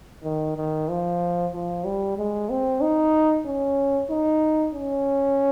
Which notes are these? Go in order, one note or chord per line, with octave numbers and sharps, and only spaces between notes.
D#3
D#3
F3
F3
G3
G#3
C4
D#4
C#4
D#4
C#4